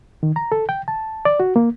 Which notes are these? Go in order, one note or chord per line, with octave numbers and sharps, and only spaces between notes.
D#3
A#5
A4
G5
A5
D5
F#4
A#3